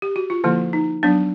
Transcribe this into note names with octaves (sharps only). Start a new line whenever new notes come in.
G4
F#4
F4
D3 F3 A#3 E4
D#4
F#3 B3 D4